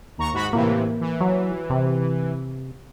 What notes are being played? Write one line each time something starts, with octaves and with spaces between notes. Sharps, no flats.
D#2 A#5 C#6
G#2 F#4 B5
A2 C3 E3 A#3
E3
F#3
C3